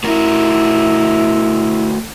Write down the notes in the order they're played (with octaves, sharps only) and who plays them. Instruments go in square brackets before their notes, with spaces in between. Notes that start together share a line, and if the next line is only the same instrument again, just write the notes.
[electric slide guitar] A3 F#4 A#4 [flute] E4